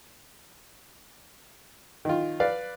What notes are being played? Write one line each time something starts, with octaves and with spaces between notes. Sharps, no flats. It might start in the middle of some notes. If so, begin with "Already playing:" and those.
D#3 F4
B4 D5 F5